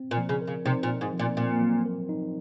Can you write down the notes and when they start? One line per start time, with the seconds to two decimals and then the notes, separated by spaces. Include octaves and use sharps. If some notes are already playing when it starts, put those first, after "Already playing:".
Already playing: C4
0.11 A#2
0.17 F3
0.29 C#3
0.41 A#4
0.47 C#3
0.65 C3 D#4
0.83 A#2
0.89 C4
1.01 G#2
1.13 F3
1.19 A#2
1.37 A#2 C4
1.61 F#3
1.86 A#4
2.09 D#4